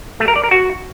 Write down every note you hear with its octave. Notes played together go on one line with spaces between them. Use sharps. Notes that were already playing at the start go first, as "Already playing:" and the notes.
A3
A#4
D5
A#4
F#4